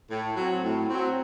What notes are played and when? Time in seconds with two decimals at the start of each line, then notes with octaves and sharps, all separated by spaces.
0.10 A2
0.37 F#3 C4
0.63 A2
0.89 F#3 C4